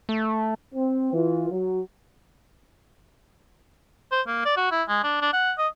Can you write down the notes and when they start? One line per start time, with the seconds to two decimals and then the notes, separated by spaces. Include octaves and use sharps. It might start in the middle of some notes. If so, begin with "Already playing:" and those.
0.09 A3
0.75 C4
1.13 E3 F4
1.50 F#3
4.12 C5
4.27 A#3
4.45 D5
4.57 F#4
4.71 E4
4.88 G#3
5.04 D4
5.22 D4
5.33 F#5
5.58 D#5